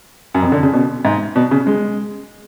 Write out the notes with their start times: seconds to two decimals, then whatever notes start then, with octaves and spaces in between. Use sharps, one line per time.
0.34 F#2
0.42 F2
0.52 D3
0.63 C#3
0.73 B2
1.05 G#2
1.36 B2
1.51 C#3
1.67 G#3